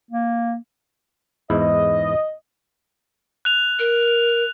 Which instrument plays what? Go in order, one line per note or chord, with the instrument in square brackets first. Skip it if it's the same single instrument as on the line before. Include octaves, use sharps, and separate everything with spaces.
[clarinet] A#3
[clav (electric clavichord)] E2 G#2 E4 [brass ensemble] D#5
[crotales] F#6 F7
[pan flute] A#4